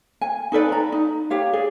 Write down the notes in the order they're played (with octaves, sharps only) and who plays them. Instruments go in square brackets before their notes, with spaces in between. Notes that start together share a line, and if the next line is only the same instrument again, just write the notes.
[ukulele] G#5
D#4 A4 B4 D5
A#5
D#4
G4 C#5 F5
G#4 D5